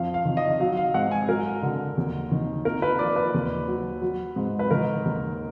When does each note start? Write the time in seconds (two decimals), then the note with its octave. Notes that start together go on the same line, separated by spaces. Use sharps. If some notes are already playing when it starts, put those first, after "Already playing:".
Already playing: F2 F3 F5
0.14 F5
0.25 D#3
0.37 D#5
0.60 F#3 F5
0.77 F5
0.94 G#2 F#5
1.11 G#5
1.28 F#3 A#4
1.62 D3
1.97 D#2
2.31 D#3
2.65 A#2 A#4
2.82 B4
2.99 F3 D5
3.16 B4
3.34 D#2
3.68 F#3
4.02 F#3
4.36 G#2
4.59 B4
4.71 D#3 A#4
5.05 D#2